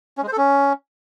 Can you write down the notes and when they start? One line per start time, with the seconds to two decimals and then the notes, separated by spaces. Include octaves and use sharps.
0.17 C#4
0.22 G#3
0.27 C5
0.32 A4
0.37 C#4